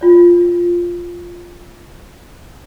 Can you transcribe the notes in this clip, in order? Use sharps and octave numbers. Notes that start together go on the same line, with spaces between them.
F4 D5